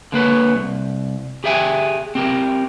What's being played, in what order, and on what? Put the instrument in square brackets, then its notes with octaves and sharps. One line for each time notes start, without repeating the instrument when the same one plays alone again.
[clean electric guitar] D3 A#3 B4 C#5
C2
G4 G#4 E5 G5 G#5
C4 G4 A#4